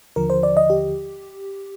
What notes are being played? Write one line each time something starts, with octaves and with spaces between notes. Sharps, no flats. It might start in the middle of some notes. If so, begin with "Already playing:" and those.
D#2 D3 F3 A#4
C5
D5
D#5
G4